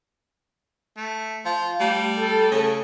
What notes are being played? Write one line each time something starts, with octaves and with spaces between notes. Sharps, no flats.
A3
F3 F5
G3 A3
A4
C#3